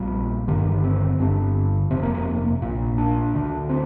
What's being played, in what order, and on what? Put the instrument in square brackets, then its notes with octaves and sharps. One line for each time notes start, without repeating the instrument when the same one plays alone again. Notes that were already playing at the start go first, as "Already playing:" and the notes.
Already playing: [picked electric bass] A#1 A#2 G3
G1 G2 D3 D#3
C4
G1 G2 D3
F1 F2 C3 C4
A#3
A#3
A#1 A#2
D4
D2 D3
C4